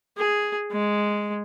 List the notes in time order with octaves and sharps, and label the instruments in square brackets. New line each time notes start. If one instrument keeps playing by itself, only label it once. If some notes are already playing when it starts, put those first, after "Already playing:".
[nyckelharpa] G#4
G#3